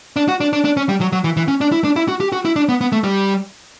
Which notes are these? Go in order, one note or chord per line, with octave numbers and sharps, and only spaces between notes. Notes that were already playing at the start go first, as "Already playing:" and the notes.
D4
F#4
D4
D4
D4
C#4
G3
F#3
F#3
E3
E3
C#4
D4
E4
D4
E4
F#4
G4
F#4
E4
D4
B3
B3
A3
G3